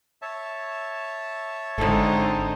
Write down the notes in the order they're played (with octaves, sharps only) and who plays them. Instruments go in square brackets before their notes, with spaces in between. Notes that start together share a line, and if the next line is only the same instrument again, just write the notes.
[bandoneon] C#5 E5 A5
[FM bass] G#1 [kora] D3 A4 [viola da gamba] G#3 C4 D#4